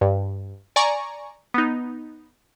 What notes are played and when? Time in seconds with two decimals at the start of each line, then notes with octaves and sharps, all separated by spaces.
0.01 G2
0.76 D5 G#5 A#5 C#6
1.54 B3 D#4